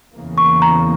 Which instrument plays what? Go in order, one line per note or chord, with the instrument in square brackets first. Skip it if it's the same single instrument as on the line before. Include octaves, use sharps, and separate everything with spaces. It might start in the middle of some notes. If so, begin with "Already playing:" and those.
[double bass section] E2 C#3 E3 A#3
[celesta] C#6
A#5